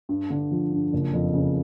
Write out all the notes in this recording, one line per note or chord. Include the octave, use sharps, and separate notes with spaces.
G2
D3
F3
G2
F#1
F2
C#3